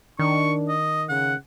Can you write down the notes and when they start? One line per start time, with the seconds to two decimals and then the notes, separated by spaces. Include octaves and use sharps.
0.19 D#3 D4 C#6
0.69 D#5
1.09 C#3 F#5